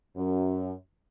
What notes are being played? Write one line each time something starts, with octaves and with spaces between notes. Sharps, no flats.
F#2